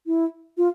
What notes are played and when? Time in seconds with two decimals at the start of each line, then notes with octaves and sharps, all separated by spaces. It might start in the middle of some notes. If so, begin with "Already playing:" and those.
0.07 E4
0.57 F4